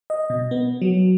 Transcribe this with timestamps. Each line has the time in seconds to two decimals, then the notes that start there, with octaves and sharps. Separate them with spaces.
0.10 D#5
0.30 B2
0.51 B3
0.82 F#3